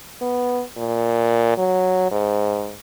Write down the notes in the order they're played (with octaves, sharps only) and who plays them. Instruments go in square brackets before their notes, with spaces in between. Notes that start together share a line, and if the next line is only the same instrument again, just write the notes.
[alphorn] B3
A#2
F#3
G#2